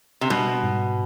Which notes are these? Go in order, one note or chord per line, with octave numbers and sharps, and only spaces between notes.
C3
B2 G3
G#2